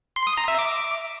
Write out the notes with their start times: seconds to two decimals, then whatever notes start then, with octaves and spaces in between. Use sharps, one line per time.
0.16 C6
0.27 D#6
0.37 A#5
0.48 E5
0.59 D6